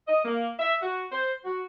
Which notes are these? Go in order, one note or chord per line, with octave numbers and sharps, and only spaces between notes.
D#5
A#3
E5
F#4
C5
F#4